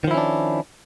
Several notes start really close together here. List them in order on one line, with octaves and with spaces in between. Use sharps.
D#3 F3 E4 C#4 D4